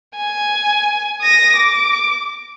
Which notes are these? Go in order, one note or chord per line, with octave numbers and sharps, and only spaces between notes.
G#5
D#6 A#6
D6